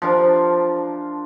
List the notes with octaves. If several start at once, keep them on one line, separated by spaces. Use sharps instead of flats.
F3 D4 A#4